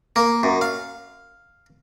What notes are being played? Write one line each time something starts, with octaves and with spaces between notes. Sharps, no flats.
A#3
F#2
F5